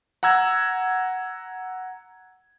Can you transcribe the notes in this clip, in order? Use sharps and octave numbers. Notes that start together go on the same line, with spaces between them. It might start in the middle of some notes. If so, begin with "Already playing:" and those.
F#5 A#5 E6 G#6